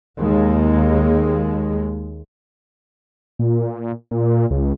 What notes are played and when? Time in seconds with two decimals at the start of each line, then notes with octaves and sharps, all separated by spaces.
0.18 D#2 G#3
3.39 A#2
4.11 A#2
4.51 C#2